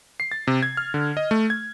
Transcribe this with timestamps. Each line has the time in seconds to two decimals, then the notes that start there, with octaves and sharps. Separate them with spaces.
0.20 C7
0.31 A6
0.47 C3
0.63 G#6
0.77 F6
0.94 D3
1.17 D#5
1.31 A3
1.50 G#6